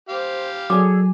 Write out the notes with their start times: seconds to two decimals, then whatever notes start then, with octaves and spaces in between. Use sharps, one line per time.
0.09 G4 C5 F5
0.70 F#3 G#4 A4 D5 G#5 D6